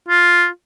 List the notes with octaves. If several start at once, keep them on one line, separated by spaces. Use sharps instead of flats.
F4